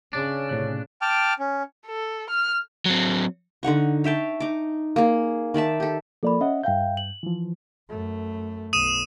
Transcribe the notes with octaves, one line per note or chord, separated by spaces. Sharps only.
C#3 C#4 D4
A2 C3 F#6
G5 A5 D6 F6
C#4
A4
F6
F#3 C4
D3 D#4 F#5 C#6
C#5 E5 G5 A5
D#4 D6
A#3 G#4
D#3 D5 E5 A5
G4 A4
F3 A#3 A4 D5 B5
C#4 D#5 E5 F#5
G2 E5 F5 G5 G6
F#7
E3 F3
F#2 A3
B1 D#6 D#7 E7